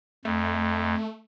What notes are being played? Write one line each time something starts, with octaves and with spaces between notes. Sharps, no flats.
F2 A3